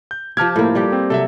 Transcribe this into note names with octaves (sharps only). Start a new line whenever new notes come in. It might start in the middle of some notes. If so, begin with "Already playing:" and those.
G6
F3 G4 A5 F6 G#6
A2 A#3
G3 G4
C4
C3 F#3 A4 E5